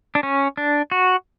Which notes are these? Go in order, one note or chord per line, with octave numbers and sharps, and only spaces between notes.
D4
C#4
D4
F#4